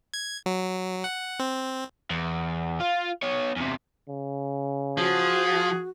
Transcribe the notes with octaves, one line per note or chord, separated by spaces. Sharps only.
G#6
F#3
F#5
C4
E2
F4
B3 C#5
E2 C3
C#3
F3 F#4 G#4